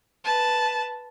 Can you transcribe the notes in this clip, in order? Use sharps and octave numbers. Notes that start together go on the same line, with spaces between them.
B4 A5